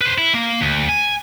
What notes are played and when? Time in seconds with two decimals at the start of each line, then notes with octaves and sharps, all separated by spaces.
0.01 B4 C5
0.18 E4
0.34 A#3
0.61 D2
0.89 G#5